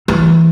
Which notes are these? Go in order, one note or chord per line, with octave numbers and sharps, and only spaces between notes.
E3